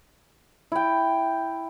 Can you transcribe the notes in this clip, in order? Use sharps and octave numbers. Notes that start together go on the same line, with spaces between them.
E4 G5